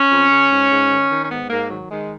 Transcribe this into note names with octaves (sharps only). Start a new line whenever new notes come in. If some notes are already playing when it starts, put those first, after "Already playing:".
Already playing: C#4
F2
C#3
G#2
G#2
D#3
D#3
C#4
G#2 B3
G#2 A#3
D#3 F#3
D#3 G#3